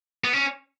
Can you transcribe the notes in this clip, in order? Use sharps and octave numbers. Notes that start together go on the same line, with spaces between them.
B3
C#4